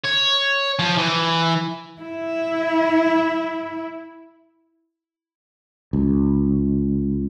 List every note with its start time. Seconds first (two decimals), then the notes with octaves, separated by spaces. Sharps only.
0.04 C#5
0.79 F3
0.97 E3
2.02 E4 E5
5.93 C#2